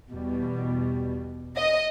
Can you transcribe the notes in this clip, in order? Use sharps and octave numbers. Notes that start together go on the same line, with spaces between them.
E2 B2 G3
D#5